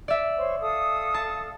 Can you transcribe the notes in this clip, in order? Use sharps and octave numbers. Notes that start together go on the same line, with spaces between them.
D5 E5
C5 C#5 C#6
A4 F5 D#6
A5